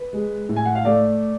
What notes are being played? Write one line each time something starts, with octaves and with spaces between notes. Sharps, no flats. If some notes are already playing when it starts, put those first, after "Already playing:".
Already playing: B4
G#3
A2
G#5
F#5
F5
A3 D5